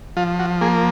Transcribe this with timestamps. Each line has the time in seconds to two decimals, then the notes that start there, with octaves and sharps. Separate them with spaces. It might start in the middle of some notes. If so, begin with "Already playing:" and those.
0.17 F3 F4
0.39 F#4
0.61 A#3 G#4